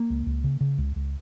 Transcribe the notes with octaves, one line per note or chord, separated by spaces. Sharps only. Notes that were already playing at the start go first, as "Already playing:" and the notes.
Already playing: A#3
C#2
C#2
C#3
C#3
C#2
C#2